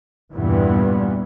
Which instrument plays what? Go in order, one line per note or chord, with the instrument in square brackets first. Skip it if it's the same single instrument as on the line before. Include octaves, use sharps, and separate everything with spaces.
[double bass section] E2 G2 A#2 E3 G3 B3